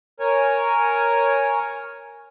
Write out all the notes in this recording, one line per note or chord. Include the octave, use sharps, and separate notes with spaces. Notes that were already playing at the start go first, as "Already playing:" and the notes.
A#4 C#5 G#5